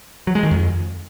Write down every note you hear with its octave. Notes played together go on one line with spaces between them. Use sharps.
F#3
G#3
D#3
F2